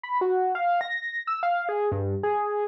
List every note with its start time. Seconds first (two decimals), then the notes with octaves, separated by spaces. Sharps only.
0.03 B5
0.21 F#4
0.55 F5
0.81 A#6
1.27 E6
1.43 F5
1.69 G#4
1.92 G2
2.23 G#4